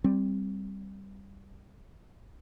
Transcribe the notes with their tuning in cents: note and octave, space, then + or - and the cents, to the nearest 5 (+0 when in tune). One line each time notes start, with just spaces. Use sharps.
G3 +0 C4 +10